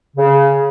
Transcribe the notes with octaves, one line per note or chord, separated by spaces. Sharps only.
C#3